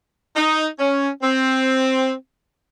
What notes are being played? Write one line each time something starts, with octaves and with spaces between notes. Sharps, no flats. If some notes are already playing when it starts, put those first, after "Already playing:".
D#4
C#4
C4